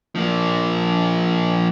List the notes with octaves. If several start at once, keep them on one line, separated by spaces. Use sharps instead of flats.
F3 A#3